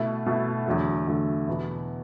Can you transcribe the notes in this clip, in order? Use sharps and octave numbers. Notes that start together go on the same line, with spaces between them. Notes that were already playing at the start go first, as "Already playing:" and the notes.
Already playing: B2 A3 E4
B2 A3 E4
E2 D3 F#3 A3
E2 D3 F#3 A3
E2 B2 B3 E4